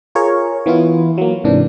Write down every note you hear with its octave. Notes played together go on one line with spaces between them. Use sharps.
F4 G#4 A#4 C#5
E3 B3 E4 F4
F#3 A#3
G#2 C3 E3 D4